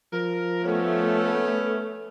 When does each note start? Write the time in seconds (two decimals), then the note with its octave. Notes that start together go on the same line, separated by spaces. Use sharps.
0.13 F3 A#4
0.65 A3 B3 C#4